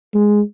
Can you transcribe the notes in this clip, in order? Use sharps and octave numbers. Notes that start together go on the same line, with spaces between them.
G#3